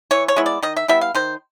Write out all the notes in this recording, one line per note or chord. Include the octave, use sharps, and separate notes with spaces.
E3 C#5
C#5
G#3 B3 E4
D5
D#3 D#5
E5
G3 B3 E4 E5
F5
D#3 C5